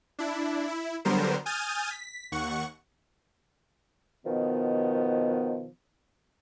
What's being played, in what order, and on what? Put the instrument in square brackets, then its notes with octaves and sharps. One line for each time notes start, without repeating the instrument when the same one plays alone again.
[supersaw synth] D4 E4
E4
D3 F#3 G3 B3 A#4 C5
G#5 D#6 F6 G6 A6
B6
D#2 F#5 C#6
[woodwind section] B2 D#3 F3 B3